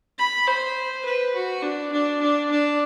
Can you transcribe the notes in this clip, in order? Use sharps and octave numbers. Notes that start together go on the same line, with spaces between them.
B5
C5
B4
F#4
D4
D4
D4
D4